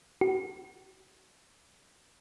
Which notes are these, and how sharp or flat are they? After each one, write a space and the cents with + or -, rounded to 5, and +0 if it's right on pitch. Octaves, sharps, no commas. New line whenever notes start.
F#4 +35